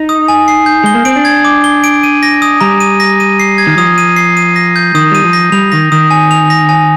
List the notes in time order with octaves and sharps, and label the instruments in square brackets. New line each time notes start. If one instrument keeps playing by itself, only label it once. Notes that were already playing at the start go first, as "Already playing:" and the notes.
Already playing: [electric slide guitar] D#4
[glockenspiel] D#6
G#5
C7
G6
[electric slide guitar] G#3 [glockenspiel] G7
[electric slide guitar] A#3
[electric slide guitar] C4 [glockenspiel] D7
[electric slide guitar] D4
[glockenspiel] G#6
D6
G7
D7
D#7
A#6
D#6
[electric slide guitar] G3 [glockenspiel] A#5
[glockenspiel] D#7
A#6
D#7
C7
G#6
[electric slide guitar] D#3
[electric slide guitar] F3 [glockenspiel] D#6
[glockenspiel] D#7
C7
D#7
A#6
G6
[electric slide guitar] D#3 [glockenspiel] D#6
[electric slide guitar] G3 [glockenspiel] D#7
[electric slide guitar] F3
[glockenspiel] A#6
[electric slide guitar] G3 [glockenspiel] F7
[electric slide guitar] D#3 [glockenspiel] A#6
[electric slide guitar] D#3 [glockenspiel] D#6
[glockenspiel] G#5
F7
A#6
G#5